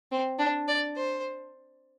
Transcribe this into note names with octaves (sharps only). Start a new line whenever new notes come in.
C4
D4
D5
C5